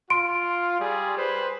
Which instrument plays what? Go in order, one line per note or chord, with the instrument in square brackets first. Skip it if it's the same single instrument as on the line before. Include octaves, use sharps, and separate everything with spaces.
[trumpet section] F4 [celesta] C6 D7
[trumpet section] G3 G#4
B4 C5